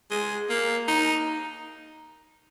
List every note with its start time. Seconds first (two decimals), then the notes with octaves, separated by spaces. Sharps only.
0.11 G#3
0.50 A#3
0.88 D#4